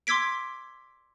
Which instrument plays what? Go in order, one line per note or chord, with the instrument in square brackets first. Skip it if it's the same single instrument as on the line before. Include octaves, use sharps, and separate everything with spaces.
[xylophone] C6 D6 E6 G#6 B6 D7